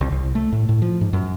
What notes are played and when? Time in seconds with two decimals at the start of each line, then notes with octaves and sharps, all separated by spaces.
0.01 C2
0.12 C2
0.35 A3
0.52 A2
0.69 A2
0.82 F3
1.01 G#2
1.13 F#2